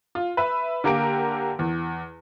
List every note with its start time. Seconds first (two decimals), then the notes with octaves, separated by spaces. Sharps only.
0.15 F4
0.37 B4 E5
0.84 D3 A#3 G4 A#4 D7
1.59 E2